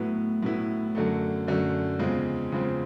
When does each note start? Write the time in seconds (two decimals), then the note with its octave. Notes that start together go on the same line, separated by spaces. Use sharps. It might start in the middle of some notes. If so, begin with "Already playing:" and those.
Already playing: A2 F#3 B3 E4
0.43 A2 F#3 B3 E4
0.95 F#2 D3 F#3 A3
1.47 F#2 D3 F#3 A3
1.99 E2 C#3 F3 G#3 C4
2.52 E2 C#3 F3 G#3 C4